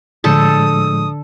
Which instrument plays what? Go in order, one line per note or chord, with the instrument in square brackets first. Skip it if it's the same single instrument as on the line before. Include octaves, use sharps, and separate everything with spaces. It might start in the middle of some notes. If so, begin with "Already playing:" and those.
[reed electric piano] A2 F3 G#3 [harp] D3 G6 C#7 [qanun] A4 [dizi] D#6